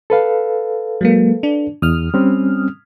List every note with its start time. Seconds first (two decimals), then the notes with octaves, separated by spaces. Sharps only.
0.10 A4 B4 F5
1.01 F#3 G#3 A#3
1.43 D4
1.82 E2 D#6 F6
2.14 G3 C4 C#4